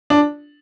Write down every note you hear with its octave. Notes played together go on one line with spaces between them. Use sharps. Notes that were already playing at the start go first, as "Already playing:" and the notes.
D4